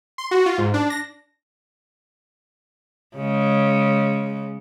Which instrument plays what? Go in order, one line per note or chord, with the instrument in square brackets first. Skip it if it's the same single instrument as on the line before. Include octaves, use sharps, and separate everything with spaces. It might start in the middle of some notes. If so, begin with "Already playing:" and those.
[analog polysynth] C6
F#4
F4
G#2
D4
A#6
[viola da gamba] C#3 G#3